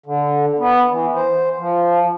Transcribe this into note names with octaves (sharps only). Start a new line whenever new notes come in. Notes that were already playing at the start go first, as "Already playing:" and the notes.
D3
B3
E3
C5
F3